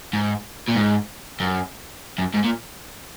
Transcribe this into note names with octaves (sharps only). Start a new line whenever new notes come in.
G#2
A#2
G#2
F#2
F#2
G#2
A#2